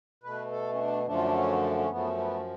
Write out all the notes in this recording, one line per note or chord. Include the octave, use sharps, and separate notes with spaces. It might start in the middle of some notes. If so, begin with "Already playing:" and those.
B2 A3 B4
A4
C#4
D4
F#2 D3 F3 A3 D4
F4
D4
C#4
C#4
F#2 F3 A3 B3
B3